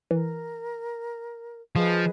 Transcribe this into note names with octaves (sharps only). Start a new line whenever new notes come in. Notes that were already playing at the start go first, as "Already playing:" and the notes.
E3 A#4
F3 G#4 B4 D#5